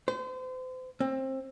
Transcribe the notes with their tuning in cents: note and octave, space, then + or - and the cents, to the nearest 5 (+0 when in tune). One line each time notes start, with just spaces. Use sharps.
C5 -35
C4 +25